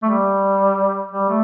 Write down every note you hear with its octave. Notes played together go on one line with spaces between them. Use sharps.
A3
G3
G3
A3